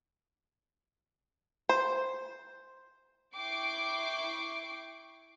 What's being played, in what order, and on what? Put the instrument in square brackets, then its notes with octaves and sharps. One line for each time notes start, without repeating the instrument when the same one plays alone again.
[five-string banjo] C5
[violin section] E4 G5 C#6 D6 C7 D7